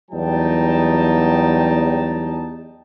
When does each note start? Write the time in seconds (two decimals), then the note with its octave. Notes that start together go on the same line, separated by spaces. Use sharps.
0.11 E2 F#3 G3 D#4 G5 A5